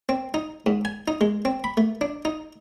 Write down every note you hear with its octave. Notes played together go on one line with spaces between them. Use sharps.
C4
D#4
G#2
G#5
D#4
G#3
C4
B5
A3
D4
D#4